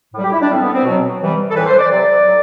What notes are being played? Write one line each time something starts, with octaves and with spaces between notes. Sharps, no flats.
A2 G3
G4
E4
D4
A2 G3 C4
B3
C4
B2 F#3
C3 E3 G3
A4
A2 E3 G3 B4
C5
D5
C3 F#3 D5
A2 F#3